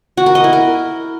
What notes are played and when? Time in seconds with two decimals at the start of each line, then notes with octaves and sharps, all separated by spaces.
0.17 F#4
0.26 A#4
0.35 D#5
0.44 E4
0.53 A#4